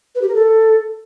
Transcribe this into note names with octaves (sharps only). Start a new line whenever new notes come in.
B4
G4
A#4
A4